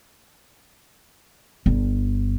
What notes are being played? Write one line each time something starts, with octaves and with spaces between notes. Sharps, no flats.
G1